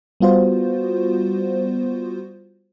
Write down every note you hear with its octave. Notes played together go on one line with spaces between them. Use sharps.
G3 B3 F4 F#4 C5